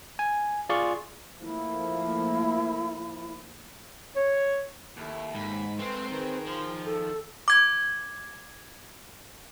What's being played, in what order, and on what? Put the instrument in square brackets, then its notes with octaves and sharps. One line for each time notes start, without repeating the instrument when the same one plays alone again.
[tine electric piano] G#5
F4 G#4 D5 C6 C#6
[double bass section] F3 A3 A#3 [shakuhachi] E4
[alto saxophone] C#5
[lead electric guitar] D#2 [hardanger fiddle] A3 E4
[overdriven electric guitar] G#2 [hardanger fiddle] B5
[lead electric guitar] G#3 A3 [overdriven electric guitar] C4 [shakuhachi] B4 [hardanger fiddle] C6
[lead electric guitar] D#3 [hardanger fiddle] G#4 A#4 [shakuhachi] B4
[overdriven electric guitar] F3 [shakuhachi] C6
[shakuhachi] A4
[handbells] D6 G#6